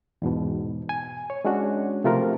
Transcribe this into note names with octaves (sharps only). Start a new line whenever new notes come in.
E2 G#2 B2
G#5
C#5
G#3 C#4 D4 F#4
C3 F3 A3 F4 G4 A#4